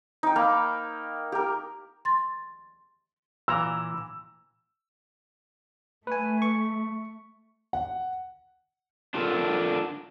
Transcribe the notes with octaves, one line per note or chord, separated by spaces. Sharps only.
D#4 G5
A#3 F5 A#5 B5
G4 A#4
C6 A6
A#2 E3 A#5 E6
A3 B4 G#5
C#6
F#5
D4 F4 F#4 A4 A#4